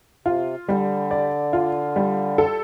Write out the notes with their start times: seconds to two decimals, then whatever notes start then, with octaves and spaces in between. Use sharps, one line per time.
0.26 C3 F4
0.68 D3 G3
1.11 D5
1.53 F4
1.96 G3
2.38 A4